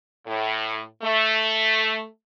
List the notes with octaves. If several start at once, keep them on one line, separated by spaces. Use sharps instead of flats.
A2
A3